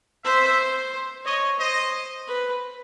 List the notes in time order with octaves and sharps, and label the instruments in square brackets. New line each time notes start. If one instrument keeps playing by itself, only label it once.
[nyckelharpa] C5 [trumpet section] E5
[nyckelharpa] C#5 [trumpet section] D#5
[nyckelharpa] C5 [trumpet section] D#5
[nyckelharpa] B4